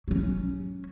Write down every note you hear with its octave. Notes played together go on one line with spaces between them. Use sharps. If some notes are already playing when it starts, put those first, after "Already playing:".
F#3 C#4